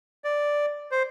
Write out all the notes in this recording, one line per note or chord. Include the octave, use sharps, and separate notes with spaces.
D5
C5